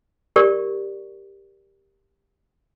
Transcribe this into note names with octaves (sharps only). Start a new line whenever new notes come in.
G4 A#4 D5 C#6